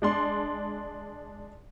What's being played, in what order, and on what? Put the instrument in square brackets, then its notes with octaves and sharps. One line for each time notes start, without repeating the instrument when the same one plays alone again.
[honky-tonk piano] G#3 D4 C6